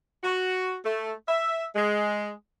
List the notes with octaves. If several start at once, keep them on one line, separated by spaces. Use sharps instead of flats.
F#4
A3
E5
G#3